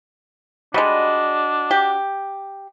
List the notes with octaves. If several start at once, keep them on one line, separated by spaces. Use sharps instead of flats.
G3 G#3 D4 F#4 D#5 B5
G4